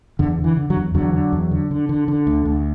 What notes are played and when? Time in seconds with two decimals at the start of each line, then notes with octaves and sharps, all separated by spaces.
0.19 E2 D3
0.39 D3
0.44 E3
0.57 D3
0.70 D3 F#3
0.76 E2
0.94 E2 D3 F#3
1.14 D3
1.32 E2
1.51 D3
1.71 D3
1.89 D3
2.08 D3
2.27 D2
2.45 D2